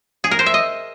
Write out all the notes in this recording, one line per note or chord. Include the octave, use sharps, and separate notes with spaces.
G#4
A#4
C5
E5
D#5